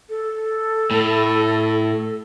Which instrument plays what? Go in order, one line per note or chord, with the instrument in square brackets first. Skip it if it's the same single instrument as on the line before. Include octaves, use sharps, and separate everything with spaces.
[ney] A4
[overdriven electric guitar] A2